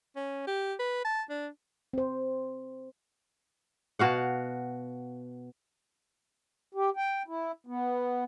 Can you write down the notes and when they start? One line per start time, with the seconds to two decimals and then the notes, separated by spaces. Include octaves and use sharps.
0.16 C#4
0.47 G4
0.79 B4
1.05 A5
1.30 D4
1.93 C4 C5
3.99 B2 F#4 F5 F#5
6.74 G4
6.97 G5
7.28 E4
7.67 B3